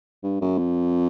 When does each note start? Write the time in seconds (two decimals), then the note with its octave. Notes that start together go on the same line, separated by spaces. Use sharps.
0.23 G2
0.41 F#2
0.58 F2